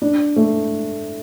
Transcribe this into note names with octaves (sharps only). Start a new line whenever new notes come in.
D4
A3